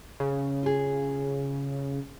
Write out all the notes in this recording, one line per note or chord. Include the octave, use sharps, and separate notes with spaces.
C#3
F4 G#4